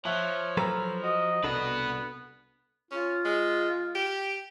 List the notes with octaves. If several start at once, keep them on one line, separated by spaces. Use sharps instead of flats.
F3 C#5 E5 A5 F#6
F#3 A4 B4 A#5 E6
F#4 D#5
C2 B3 D4 F#4 A4 B4
C#4 F4
G#3
G4